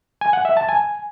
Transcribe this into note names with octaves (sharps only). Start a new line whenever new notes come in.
G#5
F#5
E5
A5
G#5